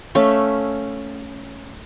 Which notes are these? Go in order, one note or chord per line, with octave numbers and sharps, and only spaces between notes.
A3 C#4 E5 F5